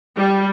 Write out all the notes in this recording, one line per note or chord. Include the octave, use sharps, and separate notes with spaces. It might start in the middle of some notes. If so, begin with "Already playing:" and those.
G3